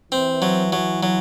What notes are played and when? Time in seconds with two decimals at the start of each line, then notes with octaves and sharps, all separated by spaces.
0.12 E3 C4
0.42 F#3
0.72 F#3
1.03 F#3